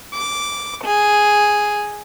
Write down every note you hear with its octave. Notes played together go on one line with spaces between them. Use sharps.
D6
G#4